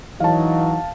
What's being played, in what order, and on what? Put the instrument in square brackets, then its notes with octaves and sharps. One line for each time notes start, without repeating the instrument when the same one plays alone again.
[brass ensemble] E3 F#3 D#4 [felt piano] F5 A5